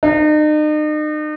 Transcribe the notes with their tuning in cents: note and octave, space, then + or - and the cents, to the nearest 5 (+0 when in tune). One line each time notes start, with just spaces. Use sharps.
D#4 -40